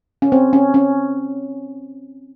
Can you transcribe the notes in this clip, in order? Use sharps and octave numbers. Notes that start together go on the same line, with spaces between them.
C#4
C4
C#4
C#4